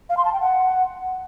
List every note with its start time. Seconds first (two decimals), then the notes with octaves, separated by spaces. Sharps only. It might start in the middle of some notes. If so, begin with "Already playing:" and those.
0.10 F5
0.17 C6
0.25 A5
0.33 G5
0.40 F#5